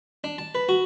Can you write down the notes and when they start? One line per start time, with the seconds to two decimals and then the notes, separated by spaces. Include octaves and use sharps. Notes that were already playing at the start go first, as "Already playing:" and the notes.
0.24 D4
0.38 A5
0.55 B4
0.69 F#4